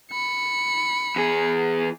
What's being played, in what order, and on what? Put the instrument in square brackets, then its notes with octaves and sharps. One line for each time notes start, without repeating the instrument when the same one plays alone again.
[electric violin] B5 C#7
[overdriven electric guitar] E2 G#4